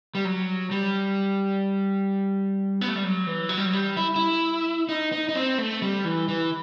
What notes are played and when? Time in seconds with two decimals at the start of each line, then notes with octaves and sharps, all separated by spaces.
0.15 G3
0.25 F#3
0.71 G3
2.81 B3
2.88 A3
2.96 G3
3.04 F#3
3.27 E3
3.49 F#3
3.57 G3
3.66 F#3
3.73 G3
3.97 E4
4.16 E4
4.89 D#4
5.12 D#4
5.29 D#4
5.35 C4
5.58 A3
5.82 G3
6.05 E3
6.28 E3